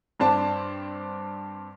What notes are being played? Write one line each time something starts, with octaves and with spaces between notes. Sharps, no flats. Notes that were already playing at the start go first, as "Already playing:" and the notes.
G2 C4 D4 A5